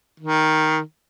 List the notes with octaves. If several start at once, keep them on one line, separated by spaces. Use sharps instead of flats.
D#3